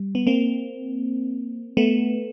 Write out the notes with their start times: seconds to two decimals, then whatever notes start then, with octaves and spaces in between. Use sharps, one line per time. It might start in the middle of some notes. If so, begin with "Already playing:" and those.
Already playing: G3
0.15 B3
0.27 A#3 C4
1.77 A3 B3